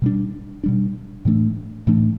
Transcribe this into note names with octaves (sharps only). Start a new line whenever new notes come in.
B2 G3 D4
B2 G3 D4
A2 E3 A3 D4
A2 E3 A3 D4